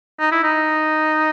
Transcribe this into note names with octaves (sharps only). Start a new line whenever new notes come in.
D#4
E4
D#4